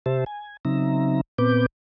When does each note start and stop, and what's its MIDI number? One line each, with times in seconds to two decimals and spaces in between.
0.06 0.24 48
0.06 0.24 67
0.06 0.24 72
0.06 0.24 76
0.06 0.24 81
0.26 0.57 80
0.65 1.21 49
0.65 1.21 54
0.65 1.21 60
0.65 1.21 63
0.65 1.21 76
0.65 1.21 82
1.38 1.66 46
1.38 1.66 59
1.38 1.66 60
1.38 1.66 71
1.38 1.66 86
1.38 1.66 91